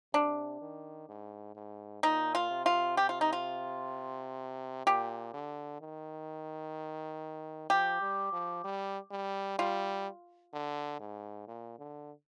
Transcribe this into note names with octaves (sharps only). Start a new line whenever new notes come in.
C3 D4
D#3
G#2
G#2
A#2 D#4
F4
C3
F4
G4
F4
D#4
F4
A#2 G4
D3
D#3
F3 G4
G3
F3
G3
G3
G3 F4
D3
G#2
A#2
D3